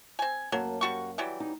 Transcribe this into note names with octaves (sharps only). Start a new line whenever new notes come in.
C4 G#5
F#2 F#3 A#3 A5
G3 F#4 C#6
E3 F#3 G3
D#4